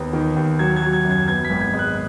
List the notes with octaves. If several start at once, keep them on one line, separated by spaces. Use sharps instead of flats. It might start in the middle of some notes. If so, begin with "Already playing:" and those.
Already playing: D#2 B3
D#3
D#2
F#3 G#6
G#6
F#3
G#6
F#2
G#6
B3 G#6
B6
G#1
G#6
G#3
F#6